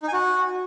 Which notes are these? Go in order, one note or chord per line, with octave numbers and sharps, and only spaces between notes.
D#4
G#5
F#4